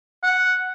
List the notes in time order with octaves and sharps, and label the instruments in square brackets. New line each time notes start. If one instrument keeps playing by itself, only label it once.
[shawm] F#5